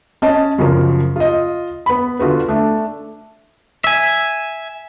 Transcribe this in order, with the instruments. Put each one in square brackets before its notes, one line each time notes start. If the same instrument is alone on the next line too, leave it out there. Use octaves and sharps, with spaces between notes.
[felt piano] C#4 D#5 A5
F#2 C#3 F3 A#4
F4 D#5
B3 B5
D3 F4 F#4 B4
A3 D4
[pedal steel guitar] E5 G#5